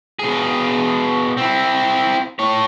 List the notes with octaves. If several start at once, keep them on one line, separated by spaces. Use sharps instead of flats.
B2 G#4
C4 E4
A3 C#5